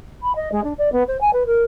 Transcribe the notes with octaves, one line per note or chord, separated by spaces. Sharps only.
B5
D#5
G#3
D4
D5
B3
C5
G#5
B4
A#4